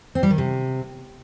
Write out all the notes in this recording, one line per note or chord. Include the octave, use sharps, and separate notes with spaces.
C4
G3
D#3
C3